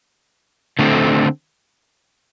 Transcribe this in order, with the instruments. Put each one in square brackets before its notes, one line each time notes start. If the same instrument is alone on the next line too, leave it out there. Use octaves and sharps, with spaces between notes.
[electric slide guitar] D3 A3 C4